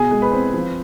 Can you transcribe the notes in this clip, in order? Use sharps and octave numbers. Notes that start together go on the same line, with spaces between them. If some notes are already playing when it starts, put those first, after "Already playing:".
Already playing: B2 G#4 G#5
G#3
B4 B5
C4
F3